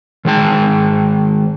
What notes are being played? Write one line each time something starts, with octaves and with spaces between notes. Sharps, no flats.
D#3 G#3 G#4 G5 A5